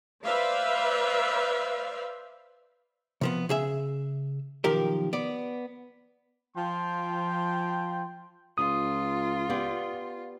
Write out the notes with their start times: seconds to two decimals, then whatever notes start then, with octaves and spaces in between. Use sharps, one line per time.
0.24 B4 C5 D5 E5 F5
3.21 C3 F3 B3
3.49 C#3 G#4 E5
4.64 B1 D#3 F3 G4 A#4
5.13 B3 D5
6.57 F3 G5 C6
8.58 C#2 F4 D#6
9.50 B3 G4 D5